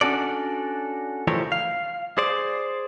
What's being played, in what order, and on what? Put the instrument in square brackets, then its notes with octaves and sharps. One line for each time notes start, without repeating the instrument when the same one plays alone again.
[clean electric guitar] C#4 D4 F#4 A4 D5
E3 F3 G3 A3 A#4 C#5
F5
G#4 C5 D5